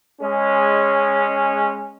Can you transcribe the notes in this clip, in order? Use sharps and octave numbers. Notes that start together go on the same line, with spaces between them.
G#3 C#4